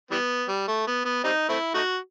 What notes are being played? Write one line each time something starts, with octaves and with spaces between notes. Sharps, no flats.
E3 G3 B3
G3
A3
B3
B3
G3 C4 D#4
A3 C4 E4
A3 D#4 F#4